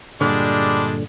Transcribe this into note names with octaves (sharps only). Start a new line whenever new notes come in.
G2 A#2 D3 G3 G#3 D4